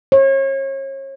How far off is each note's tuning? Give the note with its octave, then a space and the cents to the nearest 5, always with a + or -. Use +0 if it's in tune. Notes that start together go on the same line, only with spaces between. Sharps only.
C#5 -35